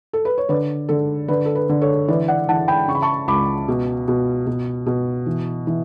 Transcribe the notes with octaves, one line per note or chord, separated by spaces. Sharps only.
A4
B4
C#5
D3 B4 D5
D3 A4
D3 B4
A4
B4
D3
A4 C#5
E3 B4 D5
D5 F#5
E3 F#5 A5
G5 B5
C#3 C#6
B5
A5 C#6
C#2 B5 D6
B2
B2
B2
B2
E3
E3